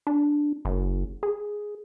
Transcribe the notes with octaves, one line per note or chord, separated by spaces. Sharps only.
D4
F#1
G#4